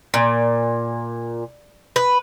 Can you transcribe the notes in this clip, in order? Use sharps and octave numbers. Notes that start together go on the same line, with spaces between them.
A#2
B4